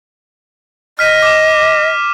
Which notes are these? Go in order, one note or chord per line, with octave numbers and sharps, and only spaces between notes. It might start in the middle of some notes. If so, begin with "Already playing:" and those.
D#5 F6 B6 D#7
D6 E7